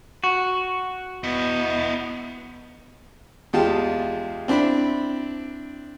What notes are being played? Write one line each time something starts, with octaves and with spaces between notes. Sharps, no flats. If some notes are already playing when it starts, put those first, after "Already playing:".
F#4
B3 E4 D#5
E2 G#3 F4 G4 A5
C4 D4 E4 B5